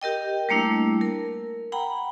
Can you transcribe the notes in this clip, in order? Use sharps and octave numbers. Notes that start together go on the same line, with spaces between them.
G4 A#4 D#5 G5
G3 A3 A#3 D4 E4
A#4
F#5 G5 A#5 B5